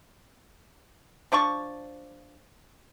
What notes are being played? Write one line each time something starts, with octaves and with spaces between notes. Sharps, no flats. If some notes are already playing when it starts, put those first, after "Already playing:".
F3 D4 A5 C#6